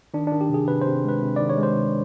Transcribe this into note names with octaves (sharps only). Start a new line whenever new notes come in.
D#3 D4
D4
D#3
G4
C3 G#4
C3 B4
C5
C3
G#3 B4
C3
D#3 D5
C#5
G#3
C5
C3